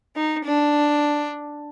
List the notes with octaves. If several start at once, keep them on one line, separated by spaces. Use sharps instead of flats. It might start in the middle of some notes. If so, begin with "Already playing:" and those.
D#4
D4